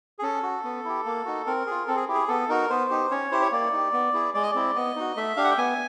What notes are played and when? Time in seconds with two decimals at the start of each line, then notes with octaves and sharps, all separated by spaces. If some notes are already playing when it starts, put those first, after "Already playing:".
0.19 G#4
0.23 C#4 A4
0.43 F#4
0.64 B3
0.85 E4 G4
1.05 A#3
1.26 D#4 F#4
1.46 C4 A#4
1.67 F4 G#4
1.88 C4 A4
1.96 G#4
2.08 E4 G4
2.14 G#4
2.28 B3 A4
2.49 D#4 F#4 A#4
2.70 B3 C5
2.90 D#4 G4
3.11 C#4 C#5
3.32 E4 G4 C5
3.42 C#5
3.52 A#3 D5
3.73 D#4 G4
3.93 B3
4.13 E4 G#4
4.34 G#3 D5
4.43 D#5
4.52 C4 E4 D5
4.75 B3 D#5
4.96 D#4 F#4
5.16 A3 E5
5.36 D4 G4 F5
5.44 F#5
5.51 G5
5.58 B3 G#5